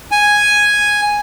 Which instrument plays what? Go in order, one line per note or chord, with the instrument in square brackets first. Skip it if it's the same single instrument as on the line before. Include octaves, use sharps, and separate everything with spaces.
[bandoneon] G#5